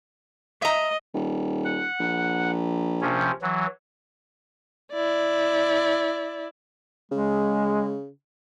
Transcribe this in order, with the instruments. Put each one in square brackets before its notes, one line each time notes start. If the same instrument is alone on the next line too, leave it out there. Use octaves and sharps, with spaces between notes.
[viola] D#5 [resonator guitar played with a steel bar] E5 A#5
[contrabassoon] D#1
[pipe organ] F#5
[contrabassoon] A#1
[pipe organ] C3 F3 C#4
E3 F#3
[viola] E4 D5
[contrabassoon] C#3 [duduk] G#3